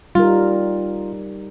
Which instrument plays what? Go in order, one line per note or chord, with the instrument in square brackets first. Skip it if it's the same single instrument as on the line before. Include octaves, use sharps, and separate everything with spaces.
[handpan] G3 D#4 A#4 [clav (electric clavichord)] F4